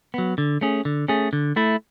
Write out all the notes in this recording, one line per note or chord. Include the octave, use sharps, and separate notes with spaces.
F#3 B3
D3
A3 C#4 G#4
D3
A3 C#4 G#4
D3
A3 E4